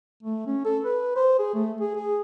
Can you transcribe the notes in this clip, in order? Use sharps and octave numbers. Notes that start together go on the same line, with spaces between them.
A3
C#4
A4
B4
C5
G#4
A3
G#4
G#4